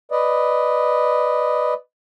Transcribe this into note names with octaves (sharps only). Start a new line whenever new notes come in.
B4 D5 D#5